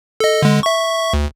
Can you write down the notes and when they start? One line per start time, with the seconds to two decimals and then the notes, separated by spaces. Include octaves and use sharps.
0.20 A4 D#5
0.42 D3 G#3
0.63 E5 C#6
1.13 D2